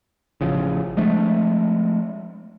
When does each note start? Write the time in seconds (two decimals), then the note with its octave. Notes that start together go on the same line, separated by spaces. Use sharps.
0.41 A1 C#3 F3
0.97 F3 G#3 A3 D4